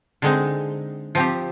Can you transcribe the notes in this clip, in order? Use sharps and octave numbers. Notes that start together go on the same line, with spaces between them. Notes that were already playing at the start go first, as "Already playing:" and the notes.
D3 G#3 C4 D#4
F3 C4 G4